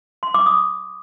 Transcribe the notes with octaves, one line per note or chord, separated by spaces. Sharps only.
C6
D6
D#6